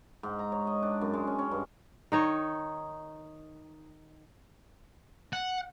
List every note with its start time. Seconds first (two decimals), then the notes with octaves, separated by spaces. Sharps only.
0.23 G#2
0.39 A#5
0.52 C#5
0.67 D#5
0.83 D4
1.01 F#2
1.14 G#3
1.27 C#4
1.39 C#4
1.51 G2
2.12 D#3 D#4 C#5
5.33 F#5